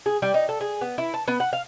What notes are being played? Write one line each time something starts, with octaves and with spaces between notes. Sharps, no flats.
G#4
G3
D#4
A4
G#4
B3
E4
A5
B3
F#5
F5